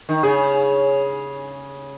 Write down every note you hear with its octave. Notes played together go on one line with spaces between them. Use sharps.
D#3
C#3 G#4